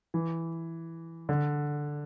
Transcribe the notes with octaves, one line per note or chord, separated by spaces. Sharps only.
E3
D3